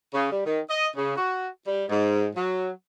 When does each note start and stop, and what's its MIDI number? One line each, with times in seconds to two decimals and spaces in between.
0.14 0.29 49
0.30 0.43 55
0.46 0.60 51
0.69 0.87 75
0.97 1.14 49
1.16 1.47 66
1.67 1.84 55
1.88 2.27 44
2.36 2.69 54